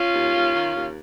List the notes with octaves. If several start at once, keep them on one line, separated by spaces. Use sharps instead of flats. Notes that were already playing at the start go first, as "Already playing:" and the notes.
Already playing: C#4 F4
D#2
D#2
D#3
D#2